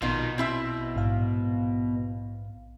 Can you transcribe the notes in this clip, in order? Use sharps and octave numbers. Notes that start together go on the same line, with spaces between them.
A#1 B2 D#3 D#4 F4
C4 E4 E5
A#1 G#2 F5